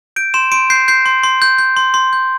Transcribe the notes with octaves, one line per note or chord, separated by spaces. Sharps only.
G6 D7
C6 E7
C6 D7
G6 C7
G6 C7
C6
C6
G6
G6
C6
C6
G6